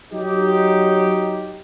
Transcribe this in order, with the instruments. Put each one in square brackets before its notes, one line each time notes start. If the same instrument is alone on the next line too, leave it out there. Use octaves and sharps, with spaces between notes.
[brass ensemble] F#3 D#4 G4